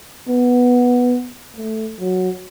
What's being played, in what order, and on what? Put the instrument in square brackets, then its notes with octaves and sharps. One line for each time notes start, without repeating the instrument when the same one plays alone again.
[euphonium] B3
A3
F#3